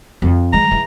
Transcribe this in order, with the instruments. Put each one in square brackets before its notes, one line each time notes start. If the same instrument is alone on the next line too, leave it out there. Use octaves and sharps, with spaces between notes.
[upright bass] F2
[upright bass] E3 G#3 [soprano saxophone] A#5
[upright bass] E3 G#3